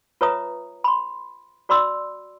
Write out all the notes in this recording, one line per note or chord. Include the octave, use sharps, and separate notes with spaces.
F4 B4 C#5 E5 A#5 D#6
B5 C6
F#4 D5 B5 C6 E6